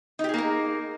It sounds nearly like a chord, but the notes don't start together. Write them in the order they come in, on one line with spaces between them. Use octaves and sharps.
D#4 G4 G#4 A#3 A#4